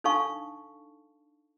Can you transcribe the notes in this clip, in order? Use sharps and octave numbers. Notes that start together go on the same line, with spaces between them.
D4 D#4 A4 F5 A5 C#6